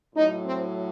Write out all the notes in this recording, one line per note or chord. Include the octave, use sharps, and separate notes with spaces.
A2 F#3 D#4
C4